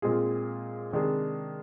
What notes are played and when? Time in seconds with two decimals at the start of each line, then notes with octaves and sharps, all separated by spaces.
0.02 A#2 G#3 C4 F4 G#4
0.92 C3 D#3 G#3 D4 G#4